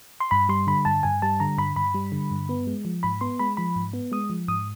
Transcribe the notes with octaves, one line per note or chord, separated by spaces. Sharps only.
C6
G2 B5
G3 C6
D3 B5
G2 A5
G2 G#5
G3 A5
D3 A#5
G2 B5
G2 B5
G3
D3
G2
B3
G#3
F3
G#2 B5
B3 C6
G#3 B5
F3 B5
G#2
B3
G#3 D#6
F3
G#2 D#6